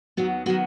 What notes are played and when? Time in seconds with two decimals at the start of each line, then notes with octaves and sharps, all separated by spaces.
0.17 D#2 D#3 F#3 B3 F#4
0.46 D#3 F#3 B3 F#4